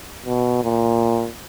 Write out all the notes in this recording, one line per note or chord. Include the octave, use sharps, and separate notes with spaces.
B2
A#2